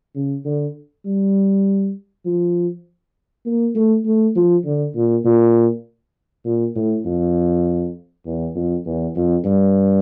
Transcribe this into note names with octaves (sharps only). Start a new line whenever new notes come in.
C#3
D3
G3
F3
A#3
A3
A3
F3
D3
A#2
A#2
A#2
A2
F2
E2
F2
E2
F2
G2